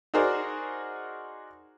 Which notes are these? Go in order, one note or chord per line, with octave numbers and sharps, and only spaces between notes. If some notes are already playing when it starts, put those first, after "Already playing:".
D#4 F#4 G#4 A#4 C5 D5